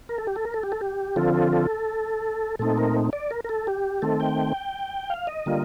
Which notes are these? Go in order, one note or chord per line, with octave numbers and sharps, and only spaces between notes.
A#4
A4
G4
A4
A#4
A4
G4
A4
G4
D3 F3 C4 F4 A4
A4
A4
A#2 A3 C4 D#4 A4
A#4
D5
A#4
A#4
A4
G4
D#3 A3 C4 A4
G5
F5
D#5
D3 G3 A#3 F4